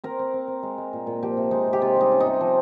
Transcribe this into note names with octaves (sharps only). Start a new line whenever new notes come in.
C4 A#4
C4
C4
C4
G#3
G#3
A#2
A#2
F3 G4
C3
G#3 D#4
C3
G4
C3 F4
G3 D#4
C#4
D#4
C3
F3